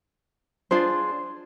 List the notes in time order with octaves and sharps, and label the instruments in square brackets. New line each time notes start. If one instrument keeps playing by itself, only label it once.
[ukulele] D4 F4 G#4 C5